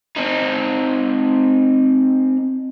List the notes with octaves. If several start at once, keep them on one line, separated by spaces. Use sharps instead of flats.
C4 D#4